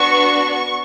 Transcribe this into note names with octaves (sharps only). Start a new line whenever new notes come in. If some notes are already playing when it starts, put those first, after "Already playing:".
Already playing: B3 D4 F#4 C#6